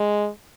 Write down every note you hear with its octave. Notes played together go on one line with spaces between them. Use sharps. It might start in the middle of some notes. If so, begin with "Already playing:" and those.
Already playing: G#3